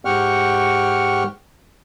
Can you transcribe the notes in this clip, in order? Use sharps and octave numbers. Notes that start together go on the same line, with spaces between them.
G#2 G4 F#5 G5 C#6 F6